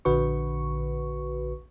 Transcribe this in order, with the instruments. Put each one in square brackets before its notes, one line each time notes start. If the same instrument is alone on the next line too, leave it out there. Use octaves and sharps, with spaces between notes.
[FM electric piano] A#1 D3 F#4 B4 C#6